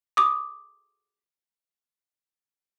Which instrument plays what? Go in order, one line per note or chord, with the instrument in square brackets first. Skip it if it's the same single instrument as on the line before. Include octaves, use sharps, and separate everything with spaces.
[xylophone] D6 D#6